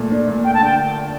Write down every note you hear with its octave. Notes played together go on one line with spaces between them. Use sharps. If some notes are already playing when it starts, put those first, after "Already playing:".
Already playing: A#2 A3
D4
A#2
A3 G5
A5
D3 G5